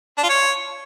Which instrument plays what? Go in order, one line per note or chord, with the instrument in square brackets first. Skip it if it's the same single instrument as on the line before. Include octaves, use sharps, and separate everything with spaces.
[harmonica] D4
F4
C#5